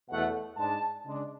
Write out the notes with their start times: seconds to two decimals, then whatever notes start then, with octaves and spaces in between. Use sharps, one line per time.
0.09 E2 B2 A3 F#5
0.56 G#2 G#3 D4 A5
1.04 C#3 G#3 D4